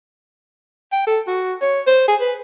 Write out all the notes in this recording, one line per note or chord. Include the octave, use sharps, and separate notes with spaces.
G5
A4
F#4
C#5
C5
G#4
B4